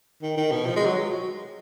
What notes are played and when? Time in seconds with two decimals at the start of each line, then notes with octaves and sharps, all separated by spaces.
0.22 D#3
0.37 D#3
0.51 B2
0.66 F3
0.76 G#3
0.86 F#3